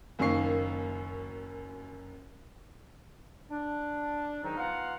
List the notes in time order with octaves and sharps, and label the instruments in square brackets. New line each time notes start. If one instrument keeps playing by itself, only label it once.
[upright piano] F#1 F#2 D#3 A#3 C#6 C7
[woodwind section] D4
G#2 D#3 F#3 D#4
B3 F4 F5 F#5 A#5